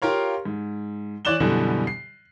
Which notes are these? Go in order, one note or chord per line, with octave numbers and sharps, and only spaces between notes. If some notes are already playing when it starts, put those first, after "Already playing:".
F4 G4 A#4 C#5 F5
G#2
E3 C#5 D5 F#6 E7 G7
F#2 B2 D3 E3 G3
C7